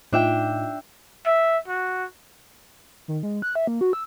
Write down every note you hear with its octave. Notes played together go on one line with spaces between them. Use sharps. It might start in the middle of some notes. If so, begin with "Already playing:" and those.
A2 D4 D#4 F4 E5 G5
E5
F#4
D#3
G#3
F#6
E5
A#3
F#4
E6